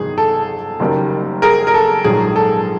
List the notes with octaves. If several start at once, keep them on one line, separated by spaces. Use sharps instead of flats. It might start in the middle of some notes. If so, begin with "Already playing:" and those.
Already playing: G1 F2 C3 D#3 F#3 G#4
A4
F#1 F#2 D#3 G3 A#3
G#4 A#4
A#4
A4
A#1 G#2 D#3 F#3 G#4
A4